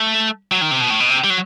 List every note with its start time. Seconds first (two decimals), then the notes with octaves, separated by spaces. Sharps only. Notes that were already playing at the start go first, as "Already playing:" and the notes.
Already playing: A3
0.52 F#3
0.61 D#3
0.71 C3
0.80 B2
0.90 A2
1.00 B2
1.10 C3
1.24 G3
1.30 F#3